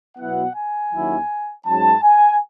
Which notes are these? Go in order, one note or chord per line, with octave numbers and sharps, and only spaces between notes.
B2 F#3 B3 E4 F#5
G#5
D#2 D#3 F#3 C#4 E4
G#2 F#3 C#4 A5
G#5